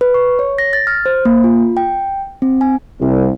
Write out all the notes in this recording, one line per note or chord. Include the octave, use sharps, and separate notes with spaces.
B4
C#6
C#5
A#6
A6
F6
C5
A#3
F4
G5
C4
G#5
C2